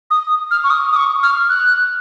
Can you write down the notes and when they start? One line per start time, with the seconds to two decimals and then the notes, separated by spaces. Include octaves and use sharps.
0.11 D#6
0.51 F6
0.64 C#6
0.70 D#6
0.92 D#6
0.96 C#6
1.23 F6
1.49 F#6